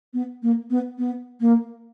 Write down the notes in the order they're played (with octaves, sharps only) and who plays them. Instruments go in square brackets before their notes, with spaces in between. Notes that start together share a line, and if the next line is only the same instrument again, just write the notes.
[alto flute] B3
A#3
B3
B3
A#3